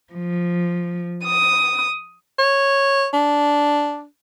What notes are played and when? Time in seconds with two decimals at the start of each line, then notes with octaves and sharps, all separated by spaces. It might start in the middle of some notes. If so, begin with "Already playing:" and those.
0.12 F3
1.25 D#6
2.39 C#5
3.13 D4